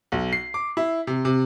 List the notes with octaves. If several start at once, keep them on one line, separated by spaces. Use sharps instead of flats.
B1
C7
D6
E4
C3
C3